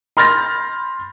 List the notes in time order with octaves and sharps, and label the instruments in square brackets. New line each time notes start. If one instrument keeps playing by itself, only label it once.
[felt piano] B5 C6 F6 G6 A6 A#6